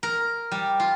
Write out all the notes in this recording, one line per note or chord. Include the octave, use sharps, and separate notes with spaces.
A#4
G3
F4